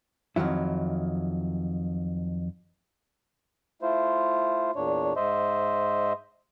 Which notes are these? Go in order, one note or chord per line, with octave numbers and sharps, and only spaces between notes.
F2 A#2 D#3 F#3 E4
A3 E4 F4 C5
E2 A#2 D4 C#5
G#2 C5 D#5 E5